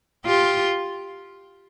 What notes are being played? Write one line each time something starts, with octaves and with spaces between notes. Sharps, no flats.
F4 G4